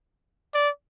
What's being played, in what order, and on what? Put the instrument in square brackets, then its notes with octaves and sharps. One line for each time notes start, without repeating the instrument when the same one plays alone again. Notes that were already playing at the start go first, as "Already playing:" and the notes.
[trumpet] D5